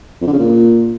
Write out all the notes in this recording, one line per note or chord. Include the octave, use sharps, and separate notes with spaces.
F2
D3
C#3
A#2